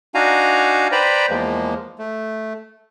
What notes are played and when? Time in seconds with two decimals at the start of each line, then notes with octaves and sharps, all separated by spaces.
0.15 D4 D#4 F#4 F5 G#5 A#5
0.92 B4 C5 D5 G5 A#5 B5
1.30 E2 F3 G#3 A#3
1.98 A3